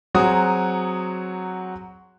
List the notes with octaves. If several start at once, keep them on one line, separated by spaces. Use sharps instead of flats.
F#3 C4 F#4 G#4 A#5 D#6